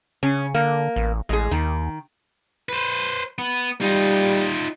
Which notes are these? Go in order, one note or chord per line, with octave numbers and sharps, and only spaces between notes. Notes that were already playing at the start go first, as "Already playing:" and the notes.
C#3 C#4
D3 A#3
A1
A1 G#3 G#4
D#2 D#3
B4 C5
B3
G3 D#4 F4